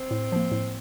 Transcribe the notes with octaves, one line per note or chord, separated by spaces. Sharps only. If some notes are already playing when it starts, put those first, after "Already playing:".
Already playing: C4
A2
F3 A#3
A2